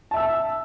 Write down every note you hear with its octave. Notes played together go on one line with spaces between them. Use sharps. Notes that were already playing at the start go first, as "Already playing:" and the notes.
E5 A5 E6